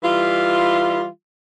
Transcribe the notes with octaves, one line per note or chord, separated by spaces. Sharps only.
E3 G3 F4